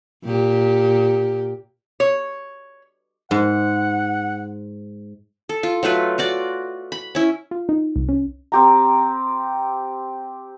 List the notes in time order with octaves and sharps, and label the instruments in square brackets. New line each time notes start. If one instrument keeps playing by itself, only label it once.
[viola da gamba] A#2 G4
[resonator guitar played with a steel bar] C#5
[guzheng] G#2 [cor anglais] F#5
[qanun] A4
F4
F#3 A3 F4 B4
F4 F#4 D5
B5
C#4 E4
[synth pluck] F4
D#4
C2
C#4
[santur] C4 G4 A#5